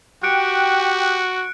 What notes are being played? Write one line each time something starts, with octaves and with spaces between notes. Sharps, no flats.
F#4 G4 G5 F#6 C#7 D7